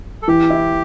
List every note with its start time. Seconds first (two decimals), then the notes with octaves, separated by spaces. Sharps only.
0.22 A4
0.28 E3 G4
0.50 E4